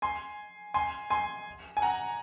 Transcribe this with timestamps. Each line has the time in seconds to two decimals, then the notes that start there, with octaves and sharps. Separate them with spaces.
0.02 G#5 C6
0.74 G#5 C6
1.10 G#5 C6
1.77 G#5
1.82 F#5 A#5